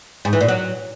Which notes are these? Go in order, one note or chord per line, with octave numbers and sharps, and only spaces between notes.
G#2
E3
A#2
F#3